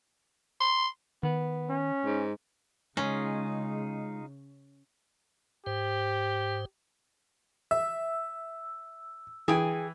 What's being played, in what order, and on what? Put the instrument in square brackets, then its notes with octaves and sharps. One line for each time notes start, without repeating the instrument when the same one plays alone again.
[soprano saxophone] C6
[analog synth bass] D#3 [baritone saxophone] B3
[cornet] C#4
[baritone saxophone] G#2
[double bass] C#3 [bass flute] G#3 [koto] C#4 [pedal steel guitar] D#4 F4 G#4
[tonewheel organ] G#2 C5 [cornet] G4
[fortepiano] E5 [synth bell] E6
[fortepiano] E3 [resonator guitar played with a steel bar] G#4 G5